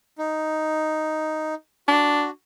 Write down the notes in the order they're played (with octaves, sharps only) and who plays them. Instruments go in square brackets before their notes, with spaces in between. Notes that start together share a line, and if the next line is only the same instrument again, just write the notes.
[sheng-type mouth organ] D#4
[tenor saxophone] D4 [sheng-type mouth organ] F#4